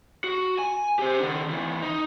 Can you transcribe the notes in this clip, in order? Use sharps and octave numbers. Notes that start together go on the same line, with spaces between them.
F#4
G#5
G4 C5
D#3 D4
D2 E3
D#4